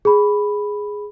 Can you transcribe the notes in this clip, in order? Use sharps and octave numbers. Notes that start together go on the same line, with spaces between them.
G#4 B5